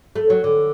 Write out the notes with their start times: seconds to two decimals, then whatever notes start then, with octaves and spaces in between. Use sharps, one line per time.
0.16 A3
0.30 F#3
0.44 D3